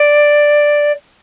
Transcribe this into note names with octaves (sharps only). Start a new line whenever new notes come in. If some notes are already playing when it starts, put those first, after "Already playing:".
Already playing: D5